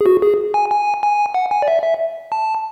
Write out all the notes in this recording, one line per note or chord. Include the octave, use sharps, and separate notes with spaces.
G#4
F#4
G#4
G#5
G#5
G#5
F#5
G#5
D5
E5
E5
A5